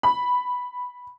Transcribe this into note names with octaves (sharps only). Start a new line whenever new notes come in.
B5